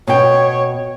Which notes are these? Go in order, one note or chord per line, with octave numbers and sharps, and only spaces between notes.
B2 C#5 G5